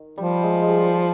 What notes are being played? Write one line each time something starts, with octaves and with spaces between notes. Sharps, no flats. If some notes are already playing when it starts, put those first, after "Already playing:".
Already playing: D#3
F3 G3
G#3
G#3
G3